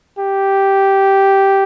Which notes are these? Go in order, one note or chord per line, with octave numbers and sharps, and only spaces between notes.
G4